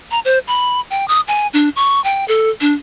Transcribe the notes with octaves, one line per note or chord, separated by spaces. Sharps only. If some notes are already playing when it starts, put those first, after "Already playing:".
A#5
C5
B5
G5
D#6
G#5
D4
C#6
G5
A4
D4